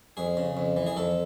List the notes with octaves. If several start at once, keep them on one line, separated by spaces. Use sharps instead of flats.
F2 G#4
C#3
F2
E3
G#4
F2 A4